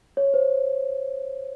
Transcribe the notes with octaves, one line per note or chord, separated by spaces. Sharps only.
C#5
C5